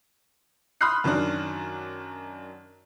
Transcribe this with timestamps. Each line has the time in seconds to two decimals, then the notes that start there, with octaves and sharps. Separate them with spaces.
0.81 B5 C6 D#6 F6 F#6 C7
1.04 F#2 D#3 F#3 D4 F#4